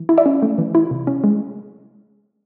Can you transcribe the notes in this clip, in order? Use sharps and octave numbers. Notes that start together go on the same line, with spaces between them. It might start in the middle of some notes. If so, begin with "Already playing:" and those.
Already playing: E3
E4
D5 E5
C#4
A3
E3
E4
C3
C#4
G#3